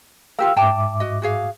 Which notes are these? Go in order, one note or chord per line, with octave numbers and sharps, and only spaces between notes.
F4 G4 A#4 F5 E6
G#2 E5 G5 A5 D6
F#4 D#5
F#4 G#4 F5